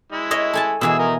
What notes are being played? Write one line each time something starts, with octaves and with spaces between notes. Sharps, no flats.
G#3 E4
C#5 D#5 E5
A4 G#5 A5
B2 E3 G#4 G#5 E6
A#4 D#5